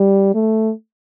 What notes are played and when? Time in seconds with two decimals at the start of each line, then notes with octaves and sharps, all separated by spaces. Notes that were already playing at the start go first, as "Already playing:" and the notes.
Already playing: G3
0.34 A3